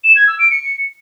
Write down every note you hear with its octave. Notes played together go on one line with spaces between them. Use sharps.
E7
G#6
E6
D7
C#7